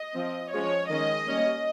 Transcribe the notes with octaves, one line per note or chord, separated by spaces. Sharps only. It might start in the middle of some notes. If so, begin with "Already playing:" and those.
Already playing: D#5
F3 C4
F3 G#3 C#4 C#5
D#3 G#3 C#4 D#5
G3 A#3 C#4